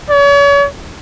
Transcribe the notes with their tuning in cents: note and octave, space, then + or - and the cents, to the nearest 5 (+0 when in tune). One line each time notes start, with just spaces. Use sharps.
C#5 +40